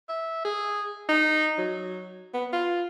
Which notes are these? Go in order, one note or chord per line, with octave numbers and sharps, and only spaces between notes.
E5
G#4
D#4
F#3
B3
F4